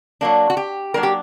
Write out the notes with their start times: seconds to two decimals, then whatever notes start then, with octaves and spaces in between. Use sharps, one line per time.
0.21 F#3 A#3 D4
0.50 F#4
0.57 G4
0.94 F#3 A#3 D4 A#4
1.03 G4